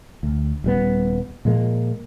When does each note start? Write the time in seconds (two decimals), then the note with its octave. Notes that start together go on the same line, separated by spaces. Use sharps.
0.23 D2
0.64 D#1 G3 B3
1.45 A#2 F3 G#3 A#3